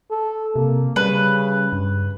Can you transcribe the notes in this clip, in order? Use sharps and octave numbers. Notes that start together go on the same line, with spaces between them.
A4
C3 A#3
C#3 G3 B4
G2